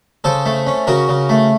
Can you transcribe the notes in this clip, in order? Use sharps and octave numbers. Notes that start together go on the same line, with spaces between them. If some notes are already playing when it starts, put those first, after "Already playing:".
C#3 A4 C5
A3
C#4
C#3 F#4 A#4
C#3
A3